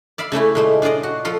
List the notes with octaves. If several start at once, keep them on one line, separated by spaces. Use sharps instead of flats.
D5 E5 F5 B5
C#3 A3 C#4 E4
A#2 G#3 A3
D4 F4 G#4 D5 D#5
F#4
F3 F4 A4